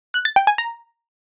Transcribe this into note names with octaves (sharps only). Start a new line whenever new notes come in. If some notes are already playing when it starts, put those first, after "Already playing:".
F#6
A6
G5
G#5
A#5